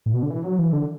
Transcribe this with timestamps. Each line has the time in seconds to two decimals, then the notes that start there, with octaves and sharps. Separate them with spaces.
0.06 A2
0.14 B2
0.23 D3
0.30 E3
0.44 F#3
0.59 E3
0.73 D3